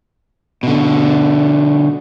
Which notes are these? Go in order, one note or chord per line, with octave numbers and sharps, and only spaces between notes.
B2 D3